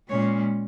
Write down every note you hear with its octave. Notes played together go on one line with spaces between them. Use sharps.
A#2 G#3 C#4 C#5